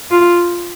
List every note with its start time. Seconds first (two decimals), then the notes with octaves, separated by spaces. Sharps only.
0.11 F4